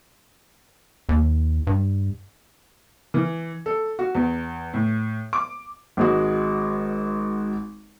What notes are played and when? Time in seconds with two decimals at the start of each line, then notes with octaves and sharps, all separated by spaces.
1.09 D#2
1.67 G2
3.14 E3
3.66 A4
3.99 F#4
4.15 E2
4.74 A2
5.33 D6
5.97 G#1 G#3 F#4